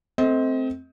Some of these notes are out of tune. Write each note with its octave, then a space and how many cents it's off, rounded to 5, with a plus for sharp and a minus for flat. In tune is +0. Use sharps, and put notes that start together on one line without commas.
A3 +0 C4 +0 D#5 +35